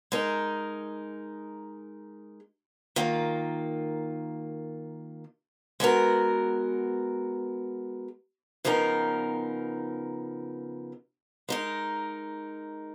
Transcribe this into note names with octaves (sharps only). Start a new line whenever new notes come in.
G#3 D#4 A#4
D#3 A#3 F4
G#3 B3 F#4 A#4
C#3 F3 B3 D#4 A#4
G#3 D#4 A#4